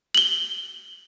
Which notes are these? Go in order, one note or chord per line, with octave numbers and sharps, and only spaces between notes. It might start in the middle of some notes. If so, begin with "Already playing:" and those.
F#7 G7